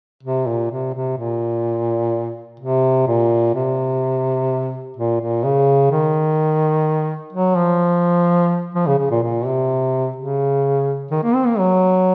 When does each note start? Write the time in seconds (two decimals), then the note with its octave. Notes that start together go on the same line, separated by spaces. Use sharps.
0.23 C3
0.47 A#2
0.71 C3
0.94 C3
1.18 A#2
2.60 C3
3.07 A#2
3.55 C3
4.97 A#2
5.20 A#2
5.43 C#3
5.91 D#3
7.33 F#3
7.57 F3
8.75 F3
8.87 C#3
8.98 C#3
9.11 A#2
9.22 A#2
9.46 C3
10.16 C#3
11.11 D#3
11.24 A#3
11.34 C4
11.46 A#3
11.59 F#3